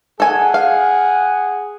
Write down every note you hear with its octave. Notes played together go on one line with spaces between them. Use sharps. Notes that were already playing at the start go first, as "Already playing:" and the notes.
G#4 A4 F#5 G#5
F5